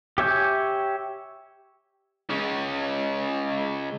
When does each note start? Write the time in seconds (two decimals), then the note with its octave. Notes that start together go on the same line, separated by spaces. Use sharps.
0.18 G4 C#5 E5 G#5 G6
2.30 C#3 G#3